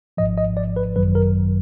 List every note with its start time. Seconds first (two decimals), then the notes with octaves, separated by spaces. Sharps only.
0.17 G#1 G#2 F3 D#5
0.37 D#5
0.57 D5
0.76 B4
0.96 G#1 F#2 D#3 F#3 B4
1.15 A#4